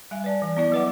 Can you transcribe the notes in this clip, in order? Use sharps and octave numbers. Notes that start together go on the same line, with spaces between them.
G3 E5 G#5
B4 D5 A5
E3
B3 E4 D5
F#3 E4 B4 E5 F#5 D6